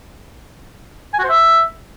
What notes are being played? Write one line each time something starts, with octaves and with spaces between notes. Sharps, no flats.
G#5
F#4
C5
E5